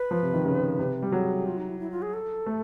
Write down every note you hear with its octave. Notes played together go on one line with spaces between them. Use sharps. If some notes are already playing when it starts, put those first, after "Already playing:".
Already playing: B4
F3
C3
D#3
C#3
C3
G3
F#3 G#4
F4
D#4
E4
E4
F4
G#4
A4
A3